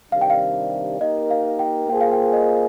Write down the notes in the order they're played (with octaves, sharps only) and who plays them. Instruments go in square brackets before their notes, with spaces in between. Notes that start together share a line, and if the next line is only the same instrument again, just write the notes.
[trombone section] C3 D#3 G3 D4 [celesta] F5
[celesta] G5
F5
[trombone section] A#3 D#4 G4 A#4 [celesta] D#5
[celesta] F5
G5
[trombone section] A#3 F4 G#4 C5 [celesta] G5
[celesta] F5
G5
D#5